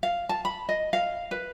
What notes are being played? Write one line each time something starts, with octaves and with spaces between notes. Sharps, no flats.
F5
A5
B5
D#5
F5
B4